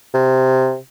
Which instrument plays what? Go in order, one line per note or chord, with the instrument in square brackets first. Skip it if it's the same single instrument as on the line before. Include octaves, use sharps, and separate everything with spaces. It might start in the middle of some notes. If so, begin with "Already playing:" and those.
[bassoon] C3